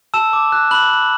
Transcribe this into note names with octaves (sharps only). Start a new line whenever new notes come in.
A5 E6 E7
D6
F#6
B5 F#6 F#7
F#6